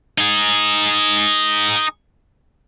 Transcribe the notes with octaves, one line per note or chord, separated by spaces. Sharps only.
D#4 G#4